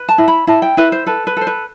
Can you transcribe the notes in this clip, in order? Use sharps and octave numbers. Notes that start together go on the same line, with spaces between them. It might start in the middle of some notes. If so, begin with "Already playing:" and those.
Already playing: B4
A5
E4
B5
E4 A5
G5
E4 B4
C5
A4 B4
B4
A4 C5
B4